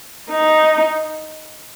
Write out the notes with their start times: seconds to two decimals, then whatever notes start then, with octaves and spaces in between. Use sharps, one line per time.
0.30 D#4